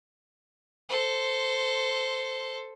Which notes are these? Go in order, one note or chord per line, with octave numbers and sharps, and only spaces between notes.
A4 C5